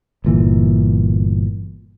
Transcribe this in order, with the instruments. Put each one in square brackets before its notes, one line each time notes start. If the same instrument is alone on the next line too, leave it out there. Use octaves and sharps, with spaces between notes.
[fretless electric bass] G1 A#2 E3